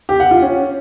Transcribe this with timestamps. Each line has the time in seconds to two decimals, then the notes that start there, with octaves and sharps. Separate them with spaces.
0.09 G4
0.20 F#5
0.31 F4
0.42 C#4